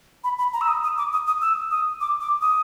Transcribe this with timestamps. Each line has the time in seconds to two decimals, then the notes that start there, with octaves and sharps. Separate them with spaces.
0.24 B5
0.38 B5
0.53 A#5
0.61 E6
0.68 D#6
0.83 D#6
0.98 D6
1.12 D#6
1.27 D#6
1.41 E6
1.71 D#6
2.01 D6
2.21 D6
2.41 D#6